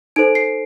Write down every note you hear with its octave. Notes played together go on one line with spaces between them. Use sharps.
D#4 A4 C5 D7
C7